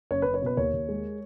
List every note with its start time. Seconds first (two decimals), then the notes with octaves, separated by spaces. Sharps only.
0.11 F#1 C#5
0.22 F#1 B4
0.34 C#5
0.42 B2 B4
0.57 D#2 C#5
0.73 D#2
0.88 G#3